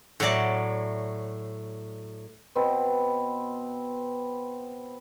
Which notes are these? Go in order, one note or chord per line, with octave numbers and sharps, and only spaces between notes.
A2 F#3 D5 A5
B2 B3 C4